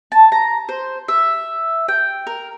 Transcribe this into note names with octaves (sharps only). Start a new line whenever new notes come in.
A5
A#5
C5
E5
G5
A#4